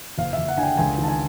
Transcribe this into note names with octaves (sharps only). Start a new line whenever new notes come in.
F#1 F5
F#1 E5
F#5
D3 G#5
G5
C#2 G#5
D#3
A5
G#5